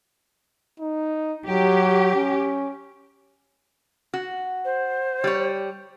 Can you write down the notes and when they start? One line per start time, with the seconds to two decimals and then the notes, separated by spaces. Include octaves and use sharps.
0.80 D#4
1.47 F#3 G4
2.15 C#4
4.14 F#4
4.65 C5
5.24 G3 C#5